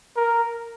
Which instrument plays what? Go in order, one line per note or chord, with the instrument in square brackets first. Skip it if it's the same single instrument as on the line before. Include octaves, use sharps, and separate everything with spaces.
[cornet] A#4